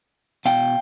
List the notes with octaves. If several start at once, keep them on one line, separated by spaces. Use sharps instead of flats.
B2 F5 G5